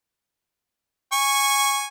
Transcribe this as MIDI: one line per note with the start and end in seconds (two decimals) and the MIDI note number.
1.12 1.86 80
1.12 1.86 85